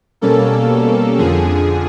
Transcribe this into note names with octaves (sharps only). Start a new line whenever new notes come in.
B2 G3 A#3 C#4 A4
F2 D3 F3 G#4